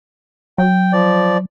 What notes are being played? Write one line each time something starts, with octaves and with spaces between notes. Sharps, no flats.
F#3 G5
F3 D5